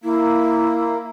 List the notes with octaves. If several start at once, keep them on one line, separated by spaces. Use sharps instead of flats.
A#3 E4